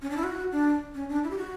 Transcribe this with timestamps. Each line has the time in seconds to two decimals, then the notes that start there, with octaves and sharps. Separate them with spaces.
0.02 C#4
0.10 D4
0.17 E4
0.24 F#4
0.52 D4
0.95 C#4
1.09 D4
1.24 E4
1.31 G4
1.38 F#4